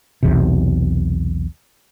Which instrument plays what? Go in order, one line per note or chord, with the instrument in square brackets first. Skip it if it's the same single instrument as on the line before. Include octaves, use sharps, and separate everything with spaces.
[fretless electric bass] B1 E2 C3